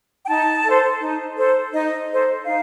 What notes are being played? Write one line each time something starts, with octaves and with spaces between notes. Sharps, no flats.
G5
D#4 A5
A4
C5
D#4
A4 C5
D#4 D#5
A4 C5
D#4 F5